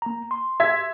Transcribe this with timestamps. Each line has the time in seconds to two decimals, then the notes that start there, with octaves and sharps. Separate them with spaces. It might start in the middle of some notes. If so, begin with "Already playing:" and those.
0.02 A#3 A#5
0.31 C6
0.60 E5 G#6 B6